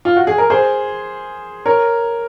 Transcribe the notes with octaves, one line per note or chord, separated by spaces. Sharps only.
F4
F#4
G#4
A#4
G#4 C5
A#4 C#5